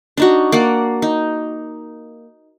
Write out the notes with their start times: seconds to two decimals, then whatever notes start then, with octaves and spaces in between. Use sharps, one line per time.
0.17 D4 D#4 F#4
0.52 A#3 D5 F#5
1.02 D#4